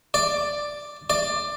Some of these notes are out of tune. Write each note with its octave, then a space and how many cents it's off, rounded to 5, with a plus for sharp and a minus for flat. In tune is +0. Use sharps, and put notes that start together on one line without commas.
D5 +5
D5 +15